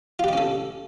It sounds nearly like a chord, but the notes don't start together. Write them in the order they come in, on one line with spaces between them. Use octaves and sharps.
F4 G4 D5 C#4 A4